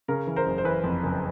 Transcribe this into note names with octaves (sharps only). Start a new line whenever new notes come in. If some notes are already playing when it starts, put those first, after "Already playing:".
C#3 A#4
E3
A#4 C5
F#1
C5
E3 B4
F2
F#1